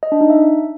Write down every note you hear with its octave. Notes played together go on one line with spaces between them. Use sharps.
D#5
D4
D#4
E5